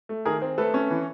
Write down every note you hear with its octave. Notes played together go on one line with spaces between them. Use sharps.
A3
D#3 G#4 A#4
C4
A3 A4 B4
C#4
E3